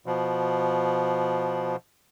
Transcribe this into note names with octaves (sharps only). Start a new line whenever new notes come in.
B2 F3